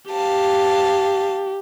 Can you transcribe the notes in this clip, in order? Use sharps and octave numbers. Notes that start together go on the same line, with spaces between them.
G4 F5 A5